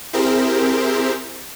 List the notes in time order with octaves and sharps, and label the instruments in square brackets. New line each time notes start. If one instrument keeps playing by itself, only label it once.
[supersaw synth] C4 E4 G4 G#4 A#4 C5